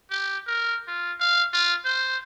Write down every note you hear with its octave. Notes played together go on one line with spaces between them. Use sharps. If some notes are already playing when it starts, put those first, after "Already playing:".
G4
A#4
F4
F5
F4
C5